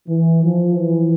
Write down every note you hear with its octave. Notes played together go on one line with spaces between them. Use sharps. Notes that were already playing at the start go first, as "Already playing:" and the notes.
E3
F3
E3